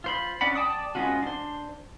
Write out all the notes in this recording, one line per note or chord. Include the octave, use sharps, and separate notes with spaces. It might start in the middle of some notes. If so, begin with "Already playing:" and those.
F4 C5 B5
C#4 D4 D5 F#5 B5
D5 G5 A5 D6 D#6
G#3 B3 C#4 F4 F#4
D4 C5